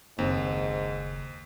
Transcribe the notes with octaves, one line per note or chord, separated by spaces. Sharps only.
F#1 D#2 G#2 C4 C5